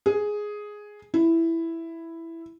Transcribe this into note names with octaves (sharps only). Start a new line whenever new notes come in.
G#4
E4